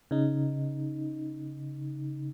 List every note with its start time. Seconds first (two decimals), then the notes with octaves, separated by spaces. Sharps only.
0.11 C#3 D#4